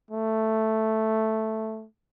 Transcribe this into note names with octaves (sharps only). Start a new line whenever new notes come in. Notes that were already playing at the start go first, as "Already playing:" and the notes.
A3